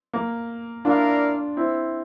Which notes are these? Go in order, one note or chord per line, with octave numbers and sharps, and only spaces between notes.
A#3
A#3 D4 E4 F4 A#4 D5 F5
C4 E4